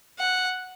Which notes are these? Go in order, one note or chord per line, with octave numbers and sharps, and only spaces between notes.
F#5